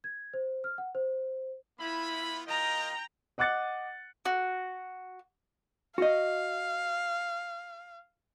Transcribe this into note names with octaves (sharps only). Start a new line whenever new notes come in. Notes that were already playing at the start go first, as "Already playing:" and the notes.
G#6
C5
F6
F#5
C5
B3 E4 F4 B5
F4 A#4 D#5 G5 A#5
D#5 F#5 D6 F#6 A6 C#7
F#4
F#4 D#5 F5